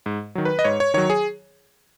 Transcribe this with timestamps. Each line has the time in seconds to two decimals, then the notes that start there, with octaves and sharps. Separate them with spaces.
0.06 G#2
0.35 D#3 F#3
0.45 B4
0.59 D#5
0.64 G#2 C#5
0.80 C#5
0.94 D#3 F#3 C#5
1.10 G#4